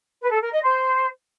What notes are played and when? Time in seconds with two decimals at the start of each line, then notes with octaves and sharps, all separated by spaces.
0.20 B4
0.31 A4
0.41 A#4
0.51 D#5
0.61 C5